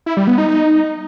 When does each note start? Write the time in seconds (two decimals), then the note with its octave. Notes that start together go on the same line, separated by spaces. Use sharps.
0.06 E4
0.17 G3
0.27 B3
0.38 D#4
0.48 D#4